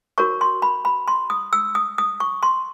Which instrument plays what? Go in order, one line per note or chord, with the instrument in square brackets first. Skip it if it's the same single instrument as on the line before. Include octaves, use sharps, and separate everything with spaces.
[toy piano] F#4 A#4 C#5 C#6
C6
B5
B5
C6
D#6
E6
D#6
D#6
C#6
C6